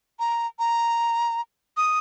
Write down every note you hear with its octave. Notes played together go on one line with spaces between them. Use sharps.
A#5
A#5
D#6